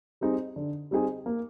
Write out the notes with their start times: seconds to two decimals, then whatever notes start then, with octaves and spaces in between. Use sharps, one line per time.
0.21 G3 C4 D#4 G#4
0.56 D3
0.91 G3 C4 D#4 G#4
1.26 A#3